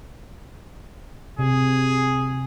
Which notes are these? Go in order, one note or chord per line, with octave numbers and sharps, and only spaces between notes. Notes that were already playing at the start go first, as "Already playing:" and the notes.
C3 G#4